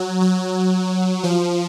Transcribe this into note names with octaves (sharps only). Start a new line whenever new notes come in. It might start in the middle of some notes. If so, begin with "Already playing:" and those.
Already playing: F#3
F#3
F3